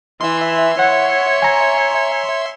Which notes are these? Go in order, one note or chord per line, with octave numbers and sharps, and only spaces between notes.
E3 E5 C6
C#5 F#5
G#5 A#5